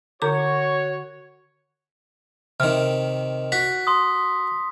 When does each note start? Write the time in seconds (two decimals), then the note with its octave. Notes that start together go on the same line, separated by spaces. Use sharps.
0.22 D3 F#4 C#5 D6
2.60 C3 D#3 F6
3.52 F#4 B6
3.87 C6 D#6